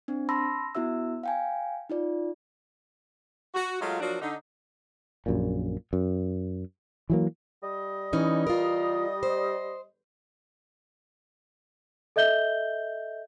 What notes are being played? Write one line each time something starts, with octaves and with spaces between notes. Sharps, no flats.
C4 D4
A5 B5 C6 E6 A#6
B3 E4 F#4 E5 E6
F5 G5 G#5
D#4 F4 D5
F#4
F#3 G#3 A3 F4
F3 F#3 A#3 D4 F#4
D3 D#4
A#1 F#2 A#2
F#2
E3 F#3 A#3
G3 D#5
E3 C#4 D#4
F4 A#4
C5
A4 D#5 E5 G6 G7